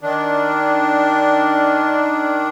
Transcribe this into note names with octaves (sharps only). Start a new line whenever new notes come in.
D#3 D4